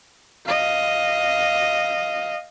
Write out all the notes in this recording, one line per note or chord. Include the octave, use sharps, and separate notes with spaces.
D#5 F5